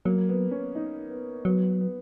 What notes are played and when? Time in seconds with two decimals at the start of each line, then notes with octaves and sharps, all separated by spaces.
0.05 F#3 A#3
0.29 B3
0.51 C#4
0.75 D#4
1.10 B3
1.45 F#3 B3
1.81 B3